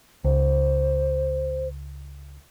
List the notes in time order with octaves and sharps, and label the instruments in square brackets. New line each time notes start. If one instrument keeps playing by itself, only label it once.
[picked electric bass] C#2 [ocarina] C5